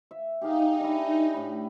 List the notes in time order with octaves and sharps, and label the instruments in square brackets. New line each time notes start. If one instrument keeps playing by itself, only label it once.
[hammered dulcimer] E5
[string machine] D#4 [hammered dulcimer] G4 G#4 F5
[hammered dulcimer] D4 E4
A2 B5